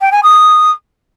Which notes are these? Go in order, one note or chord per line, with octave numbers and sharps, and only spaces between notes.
G5
G#5
D#6